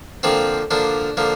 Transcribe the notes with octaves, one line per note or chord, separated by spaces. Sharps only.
D3 F3 A#3 C4
D3 F3 A#3 D4
D3 F3 A#3